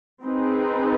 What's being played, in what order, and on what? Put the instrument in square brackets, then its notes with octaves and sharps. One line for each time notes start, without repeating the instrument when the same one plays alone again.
[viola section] C4 D#4 G#4 B4